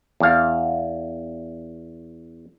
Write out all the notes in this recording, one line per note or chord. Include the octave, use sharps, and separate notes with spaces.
E2 F5